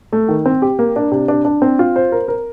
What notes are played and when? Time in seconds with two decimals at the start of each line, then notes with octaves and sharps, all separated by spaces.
0.13 A3
0.29 D#3
0.46 C4
0.62 G4
0.79 A#3
0.96 D4
1.12 C3
1.28 D4
1.45 D4
1.62 C4
1.79 F4
1.96 C5
2.12 A#4
2.28 A#4